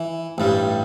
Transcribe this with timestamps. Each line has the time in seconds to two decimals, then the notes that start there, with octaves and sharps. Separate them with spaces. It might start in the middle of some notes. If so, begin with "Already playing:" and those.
Already playing: E3
0.38 A1 G2 G3